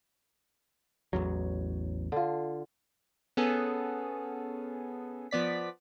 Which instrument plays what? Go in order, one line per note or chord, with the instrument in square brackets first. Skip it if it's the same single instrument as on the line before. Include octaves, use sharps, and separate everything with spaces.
[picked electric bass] A1 E2 F#3
[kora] D3 F4
[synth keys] B3 C#4 G#4 A4
F3 B3 D5 B6